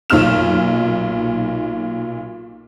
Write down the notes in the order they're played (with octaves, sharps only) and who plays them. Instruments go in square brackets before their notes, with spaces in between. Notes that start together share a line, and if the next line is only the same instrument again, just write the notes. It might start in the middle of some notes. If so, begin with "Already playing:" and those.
[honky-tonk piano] B1 A#2 D#4 F6 E7